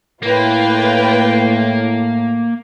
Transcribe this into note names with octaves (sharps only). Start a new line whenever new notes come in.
A2 A#3 F4 B4 G5